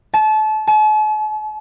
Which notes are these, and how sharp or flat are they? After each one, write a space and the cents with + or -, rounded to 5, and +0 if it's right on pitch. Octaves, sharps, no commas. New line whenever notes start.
A5 -30
A5 -45